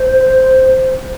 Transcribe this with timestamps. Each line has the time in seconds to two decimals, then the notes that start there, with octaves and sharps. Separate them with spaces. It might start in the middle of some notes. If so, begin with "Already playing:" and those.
Already playing: C5